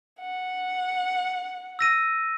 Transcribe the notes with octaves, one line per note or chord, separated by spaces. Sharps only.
F#5
E6 A#6 D#7